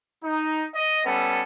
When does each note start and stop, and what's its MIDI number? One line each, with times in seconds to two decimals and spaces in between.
0.23 0.65 63
0.74 1.01 75
1.05 1.42 55
1.05 1.42 59
1.05 1.42 61
1.05 1.42 69